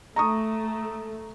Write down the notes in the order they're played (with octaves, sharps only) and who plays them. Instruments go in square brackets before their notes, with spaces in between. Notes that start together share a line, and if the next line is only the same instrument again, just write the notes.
[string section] A3 [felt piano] A#5 C#6 D#6